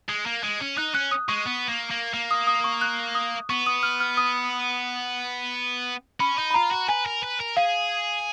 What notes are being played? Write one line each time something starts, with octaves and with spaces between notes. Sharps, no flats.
G#3
A#3
G#3
C#4
D#4 F#6
C#4 F#6
D#6
G#3 C#6
B3
A#3
A#3
A#3
D#6
D#6
C#6
F#6
D#6
B3 C#6
D#6
F6
F6
D#6
C#4 B5
D#4
B5
F4 A#5
F#4
B4 G#5
A#4
B4
A#4
G#4 F5